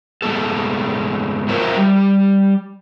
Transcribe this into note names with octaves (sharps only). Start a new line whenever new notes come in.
G#2 G3 A3 B3 A4
F4 A#4 C5 C#5 E5
G3